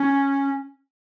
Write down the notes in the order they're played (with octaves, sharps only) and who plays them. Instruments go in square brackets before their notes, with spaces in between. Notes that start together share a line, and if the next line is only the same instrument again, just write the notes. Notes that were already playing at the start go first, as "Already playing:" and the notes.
Already playing: [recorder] C#4